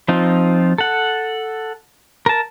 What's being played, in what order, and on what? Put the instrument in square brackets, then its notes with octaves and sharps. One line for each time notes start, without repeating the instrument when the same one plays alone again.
[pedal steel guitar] F3 C4 D#4 F4
A4 F#5
A#4 A5